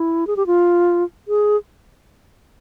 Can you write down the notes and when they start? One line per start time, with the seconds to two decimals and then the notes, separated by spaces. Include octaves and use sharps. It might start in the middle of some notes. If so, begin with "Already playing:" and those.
Already playing: E4
0.27 G#4
0.37 G4
0.47 F4
1.28 G#4